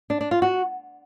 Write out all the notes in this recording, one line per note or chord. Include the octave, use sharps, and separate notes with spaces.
D4
D4
F4
F#4